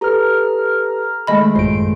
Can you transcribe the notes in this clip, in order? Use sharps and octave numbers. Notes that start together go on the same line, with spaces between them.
G4 A4 B4 A#5 F6
D#3 G#3 A3 D#5 B5
A1 F#2 F4 C5 D7